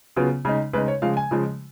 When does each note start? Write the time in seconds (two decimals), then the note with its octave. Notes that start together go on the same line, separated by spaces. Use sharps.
0.16 C#3 F#3 B3 F4
0.45 C#3 G#3 D#4
0.73 C#3 G#3 D#4 B4
0.88 C#5
1.02 C#3 F3 G#3 F5
1.17 G#5
1.31 C#3 F3 G#3